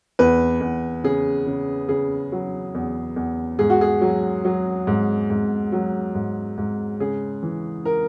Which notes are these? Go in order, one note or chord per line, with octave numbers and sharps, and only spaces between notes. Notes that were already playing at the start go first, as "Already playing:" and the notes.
E2 B4
E2
C#3 G#4
C#3
C#3 G#4
F#3
E2
E2
G#2 G#4
F#4
G#4
F#3
F#3
G#2
G#2
F#3
G#2
G#2
C#3 G#4
E3
A#4